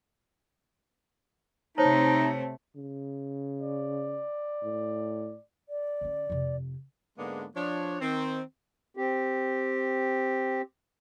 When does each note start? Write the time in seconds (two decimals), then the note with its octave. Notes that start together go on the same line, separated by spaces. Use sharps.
1.78 C3 A3 D#4 C5 C#5 A5
2.76 C#3
3.62 D5
4.63 A2
5.69 D5
6.01 D3 C#4
6.30 F2 C3
7.18 G#2 D3 G#3 A#3 B3 D4
7.56 F3 D4 C#5
8.01 D#3 C4
8.97 C4 G4